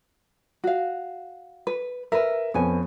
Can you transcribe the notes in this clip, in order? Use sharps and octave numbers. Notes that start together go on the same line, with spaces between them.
F#4 F5
B4
A#4 B4 E5
F2 B3 C#4 G#5